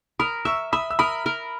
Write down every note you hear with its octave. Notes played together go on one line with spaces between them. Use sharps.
A#4 B5 D#6
E5 C#6 E6
E5 B5 D#6
E6
A#4 B5 D#6
A#4